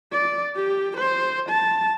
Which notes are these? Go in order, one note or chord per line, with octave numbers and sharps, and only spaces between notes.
D5
G4
C5
A5